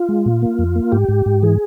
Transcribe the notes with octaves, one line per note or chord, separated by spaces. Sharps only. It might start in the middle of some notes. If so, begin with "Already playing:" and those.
Already playing: F4
G#3
A#2
A#3
F2
A#3
G#2 G4
G#2
G#2
E3 G#4